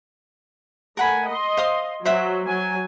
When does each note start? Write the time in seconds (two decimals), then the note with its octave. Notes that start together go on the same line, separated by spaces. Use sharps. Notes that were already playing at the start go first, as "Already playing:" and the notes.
0.97 A3 A#4 F#5 G#5 B5
1.27 D#5 C6
1.57 C5 F5 D#6
2.05 F#3 C5 E5 F#5
2.47 F#3 G#5